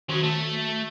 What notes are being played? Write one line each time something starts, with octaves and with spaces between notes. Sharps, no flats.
D#3 F#3 C#4 F#4
A3 A5